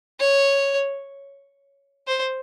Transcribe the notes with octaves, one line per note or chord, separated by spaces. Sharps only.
C#5
C5